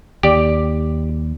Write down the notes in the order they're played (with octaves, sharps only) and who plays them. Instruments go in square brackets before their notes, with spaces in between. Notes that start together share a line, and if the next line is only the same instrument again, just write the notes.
[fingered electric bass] D#2 [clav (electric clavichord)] G4 D5